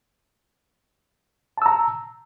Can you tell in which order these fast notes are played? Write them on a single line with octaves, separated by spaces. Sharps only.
A5 E6 A#5